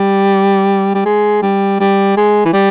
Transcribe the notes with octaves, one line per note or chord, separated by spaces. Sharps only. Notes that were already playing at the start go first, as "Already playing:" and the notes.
Already playing: G3
G3
G#3
G3
G3
G#3
E3
G3